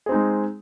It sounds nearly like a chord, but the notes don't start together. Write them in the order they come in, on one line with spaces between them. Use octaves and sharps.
G#4 C4 D#4 G#3